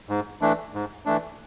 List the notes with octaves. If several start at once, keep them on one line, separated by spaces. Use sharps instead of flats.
G#2
E3 A3 D4
G#2
E3 A3 D4